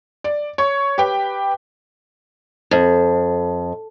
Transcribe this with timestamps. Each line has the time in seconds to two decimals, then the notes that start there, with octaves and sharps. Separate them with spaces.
0.24 D5
0.58 C#5
0.98 G4 B4 G5
2.71 F2